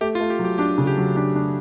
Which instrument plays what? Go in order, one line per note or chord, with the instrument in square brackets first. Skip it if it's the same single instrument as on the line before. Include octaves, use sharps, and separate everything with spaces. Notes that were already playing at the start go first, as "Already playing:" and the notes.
[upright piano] A3 [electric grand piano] G4
[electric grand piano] F4
[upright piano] A3
[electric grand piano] G4
[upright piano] F#3
[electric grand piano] G4
[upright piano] D4 [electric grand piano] G4
[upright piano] C#3
[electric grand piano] G4
[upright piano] F#3
[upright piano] D4 [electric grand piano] G4
[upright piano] D4